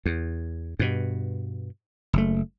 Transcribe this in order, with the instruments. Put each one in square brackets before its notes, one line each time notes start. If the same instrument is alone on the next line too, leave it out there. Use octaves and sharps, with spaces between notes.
[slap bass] E2
G2 B2
F#1 A3